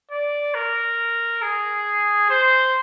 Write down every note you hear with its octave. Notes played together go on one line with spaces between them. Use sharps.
D5
A#4
G#4
C5